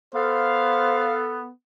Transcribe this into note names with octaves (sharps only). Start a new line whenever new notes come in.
B3 A4 C5 F5